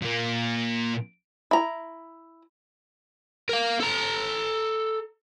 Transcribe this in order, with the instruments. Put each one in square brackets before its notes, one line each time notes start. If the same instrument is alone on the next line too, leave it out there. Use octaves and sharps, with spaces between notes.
[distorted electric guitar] A#2 A#3
[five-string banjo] E4 A#5
[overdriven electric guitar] A#4 F5
A4 A#5